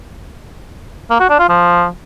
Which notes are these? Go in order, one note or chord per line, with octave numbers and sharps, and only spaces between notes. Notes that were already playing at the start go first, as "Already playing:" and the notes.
A#3
F#4
D4
F4
F3